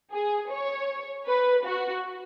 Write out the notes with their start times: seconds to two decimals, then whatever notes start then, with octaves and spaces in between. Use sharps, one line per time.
0.12 G#4
0.50 C#5
1.26 B4
1.64 F#4